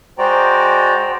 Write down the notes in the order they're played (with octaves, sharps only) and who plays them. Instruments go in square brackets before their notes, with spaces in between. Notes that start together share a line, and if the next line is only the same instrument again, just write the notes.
[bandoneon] G#3 F#4 D5 [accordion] C5 G5 A#5